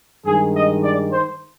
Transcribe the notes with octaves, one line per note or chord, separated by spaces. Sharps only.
G2 D#3 G#3 G#4
D#5
D5
C5